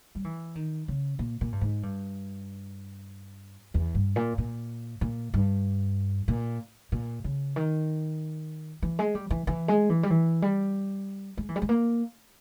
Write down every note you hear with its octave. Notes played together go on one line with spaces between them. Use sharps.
G3
E3
D#3
C#3
A#2
A#2
G2
G#2
G2
E2
G2
A#2
A#2
A#2
G2
A#2
A#2
C#3
D#3
E3
G#3
G3
E3
E3
G#3
E3
G3
E3
G3
G#3
E3
G3
G#3
A#3